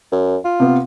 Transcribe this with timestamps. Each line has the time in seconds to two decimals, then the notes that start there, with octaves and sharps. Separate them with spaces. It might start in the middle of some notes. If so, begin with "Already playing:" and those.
0.12 F#2
0.45 F4
0.60 C3 B3